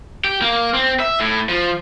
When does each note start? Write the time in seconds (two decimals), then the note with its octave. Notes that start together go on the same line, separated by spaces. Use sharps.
0.24 G4
0.42 A#3
0.74 C4
1.00 E5
1.20 A2
1.49 F3